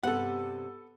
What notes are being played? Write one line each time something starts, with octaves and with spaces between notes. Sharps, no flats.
G2 C3 B3 G4 A4 F#5